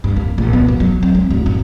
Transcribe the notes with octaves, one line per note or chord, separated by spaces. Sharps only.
G2
A#3
A#1
B3
F#2
F#3
C4
G#3
D1
F#2